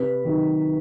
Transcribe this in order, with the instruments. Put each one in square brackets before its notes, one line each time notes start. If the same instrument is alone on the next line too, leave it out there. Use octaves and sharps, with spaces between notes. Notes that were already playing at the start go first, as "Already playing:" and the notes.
Already playing: [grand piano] C3 [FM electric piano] B4
[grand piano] D#3 F#3